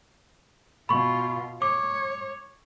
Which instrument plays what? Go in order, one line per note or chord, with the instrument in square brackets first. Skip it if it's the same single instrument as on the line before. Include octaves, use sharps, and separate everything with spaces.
[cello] B2 F4 [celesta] B5 C#6
[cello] C#5 [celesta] D6